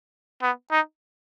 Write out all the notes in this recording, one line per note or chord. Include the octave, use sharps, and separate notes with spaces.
B3
D#4